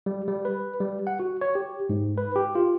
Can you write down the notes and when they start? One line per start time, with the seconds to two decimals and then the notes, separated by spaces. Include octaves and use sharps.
0.06 G3
0.28 G3
0.45 B4
0.80 G3
1.07 F#5
1.20 F#4
1.41 C#5
1.55 G4
1.89 G#2
2.17 B4
2.36 G4
2.55 F4